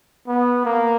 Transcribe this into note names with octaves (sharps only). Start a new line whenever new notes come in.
B3
A#3